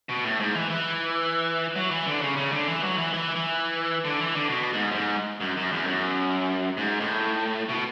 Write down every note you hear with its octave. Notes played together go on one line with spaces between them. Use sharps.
B2
A2
G#2
E3
E3
F#3
E3
D3
C#3
C#3
D3
E3
F#3
E3
E3
E3
D3
E3
D3
B2
G#2
F#2
G#2
F#2
F#2
E2
F#2
G#2
A2
B2